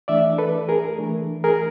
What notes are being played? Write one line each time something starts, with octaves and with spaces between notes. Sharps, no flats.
E3 A3 D4 D5 E5
A4 B4
G#4 A#4
E3 A3 D4
G#4 A#4